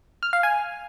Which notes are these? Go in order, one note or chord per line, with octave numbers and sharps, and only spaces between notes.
F6
F5
G#5